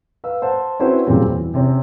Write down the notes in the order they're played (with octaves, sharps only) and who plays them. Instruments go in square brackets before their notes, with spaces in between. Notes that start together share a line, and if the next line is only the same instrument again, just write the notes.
[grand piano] B4 F5 E6
C5 F#5 A5
C4 C#4 E4 F#4 B4 C5
A#2 C#3 F#3 G3 C4
E2
C3 C4 C#4